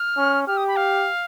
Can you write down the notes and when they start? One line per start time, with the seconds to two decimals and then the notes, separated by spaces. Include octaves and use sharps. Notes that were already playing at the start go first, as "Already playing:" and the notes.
Already playing: F6
0.17 C#4
0.47 G4 F6
0.57 D#6
0.68 B5
0.76 F5